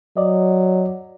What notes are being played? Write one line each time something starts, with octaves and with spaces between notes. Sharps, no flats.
F#3 D5 D#5